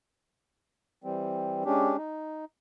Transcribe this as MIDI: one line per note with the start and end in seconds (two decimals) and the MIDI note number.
1.04 1.64 52
1.04 1.64 55
1.04 1.64 60
1.65 1.97 56
1.65 1.97 61
1.65 1.97 62
1.65 1.97 67
1.97 2.45 63